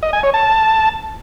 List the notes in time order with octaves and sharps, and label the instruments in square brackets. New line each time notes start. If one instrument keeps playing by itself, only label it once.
[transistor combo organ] D#5
G#5
C#5
A5